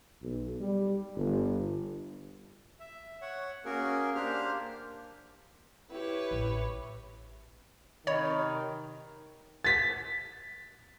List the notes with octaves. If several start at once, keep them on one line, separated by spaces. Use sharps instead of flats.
B1
G3
G1
E5
C#5 F#5
A#3 C#4 F#4 G#4 A#4
A#3 D4 G4 C5 F6
E4 G4 B4 C#5
A1
C3 D#3 C#5 D#5 B5
A6 B6